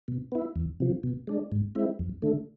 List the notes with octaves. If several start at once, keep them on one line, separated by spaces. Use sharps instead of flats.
B2
B3 E4
E2
C3 F3
B2
G#3 D4
G#2
G#3 C4 E4
F2
D3 A3